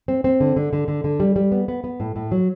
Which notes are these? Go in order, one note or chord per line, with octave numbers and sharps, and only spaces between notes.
C4
C4
D3
D3
D3
D3
D3
G3
G3
B3
B3
B3
A2
A2
F#3